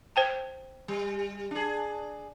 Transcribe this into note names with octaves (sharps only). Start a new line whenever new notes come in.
C5 G5 A5
G3
D4 G#4